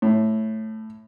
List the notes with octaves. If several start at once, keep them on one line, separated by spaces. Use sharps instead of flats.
A2